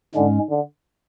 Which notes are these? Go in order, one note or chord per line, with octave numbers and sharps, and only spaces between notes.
G#2 D3 G#3 C#4
D3